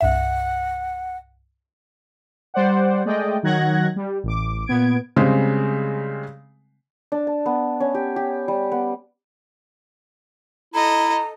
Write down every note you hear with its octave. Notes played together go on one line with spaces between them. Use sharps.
C2 G2 E5 F#5
G3 C5 D5 F#5
G#3 A3 D5 D#5 G5
D#3 F#3 F#5 F#6 G#6 A#6
G3
A1 D6
A#2 B3 G#6 D7
C#3 G3 G#3 C4
D4
A5
B3
C#4
G4
G4
G3
B3
E4 A4 D#5 A#5